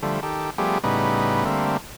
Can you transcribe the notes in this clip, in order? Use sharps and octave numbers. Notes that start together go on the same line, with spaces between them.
D3 F3 G3 A3
D#3 G4 A4
F3 G3 A3 B3 G4 G#4
A2 C#3 G3 B3 D#4 B4
D3 G3 A3 A#3 C4